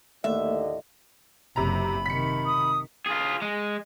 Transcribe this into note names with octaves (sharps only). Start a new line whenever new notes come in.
D#2 A2 D3 A3 A#3 D#5 E5
F#1 C3 A#5 B5
C3 D#3 B6 C#7
D#6
F4 G#4
G#3